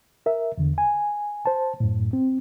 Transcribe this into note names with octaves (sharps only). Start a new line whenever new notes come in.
A#4 E5
E2 D3
G#5
C5 A5
F#2 A2
C4